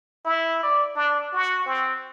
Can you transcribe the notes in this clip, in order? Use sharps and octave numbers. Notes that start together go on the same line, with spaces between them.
E4
D5
D4
F#4
C4